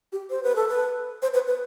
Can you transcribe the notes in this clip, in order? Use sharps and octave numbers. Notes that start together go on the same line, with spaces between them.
G4
C5
B4
A4
B4
C5
B4
B4